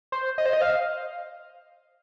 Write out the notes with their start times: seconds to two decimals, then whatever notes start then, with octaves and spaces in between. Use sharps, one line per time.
0.12 C5
0.38 D#5
0.46 C5
0.53 D#5
0.62 F5